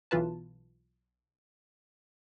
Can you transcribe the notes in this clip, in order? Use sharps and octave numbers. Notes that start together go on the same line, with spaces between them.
B1 E3 F4 B4 A5